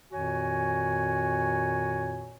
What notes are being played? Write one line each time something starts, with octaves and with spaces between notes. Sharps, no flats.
F2 A#2 D#3 F#4 C#5 G#5